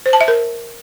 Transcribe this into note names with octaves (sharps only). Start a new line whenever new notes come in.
C5
A5
E5
A#4